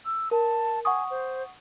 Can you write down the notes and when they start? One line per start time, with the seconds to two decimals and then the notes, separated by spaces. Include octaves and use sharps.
0.06 E6
0.31 A#4 A5
0.85 F#5 G#5 C#6 D#6
1.11 C5